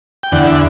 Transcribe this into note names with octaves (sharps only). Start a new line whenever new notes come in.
G5
E2 D3 F#5
E5